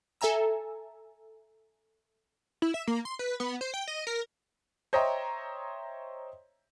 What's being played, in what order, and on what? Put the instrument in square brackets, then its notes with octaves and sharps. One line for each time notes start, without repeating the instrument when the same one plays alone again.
[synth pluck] A4 E5 G#5 A#5 E6
[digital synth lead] E4
E5
A#3
C6
B4
B3
C5
G5
D#5
A#4
[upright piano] C5 C#5 D#5 E5 G5 A#5